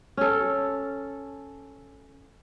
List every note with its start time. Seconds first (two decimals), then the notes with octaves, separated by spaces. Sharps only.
0.17 C#4 A4